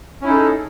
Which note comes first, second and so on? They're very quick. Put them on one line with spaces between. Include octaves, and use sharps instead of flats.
C#4 E4 D#4 A4 G#4